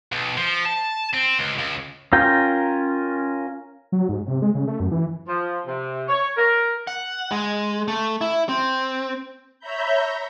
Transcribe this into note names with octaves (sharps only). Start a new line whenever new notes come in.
B1
F3
A5
C4
C#2
C#2
C#4 F4 A#4 G5
F#3
G#2
C3
G#3
C#3
A3
F#2
E3
F3
C3
C#5
A#4
F#5
G#3
A3
E4
C4
C#5 E5 A#5 B5 G6